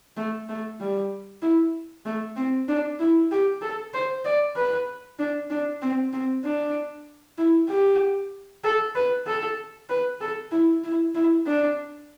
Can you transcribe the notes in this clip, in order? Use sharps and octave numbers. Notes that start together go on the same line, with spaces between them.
A3
A3
G3
E4
A3
C4
D4
E4
G4
A4
C5
D5
B4
D4
D4
C4
C4
D4
E4
G4
A4
B4
A4
B4
A4
E4
E4
E4
D4